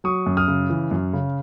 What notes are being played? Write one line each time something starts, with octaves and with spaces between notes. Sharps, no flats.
F#3 C#6 D#6
F#2
D#6 F6
C#3
E3
F#2
C#3